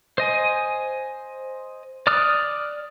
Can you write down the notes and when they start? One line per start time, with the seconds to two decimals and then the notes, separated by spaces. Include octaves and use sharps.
0.18 C5 D#5 G#5
2.07 D5 D6 D#6 F6 F#6